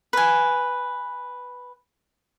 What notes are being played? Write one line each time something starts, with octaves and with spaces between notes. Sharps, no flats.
B4 G#5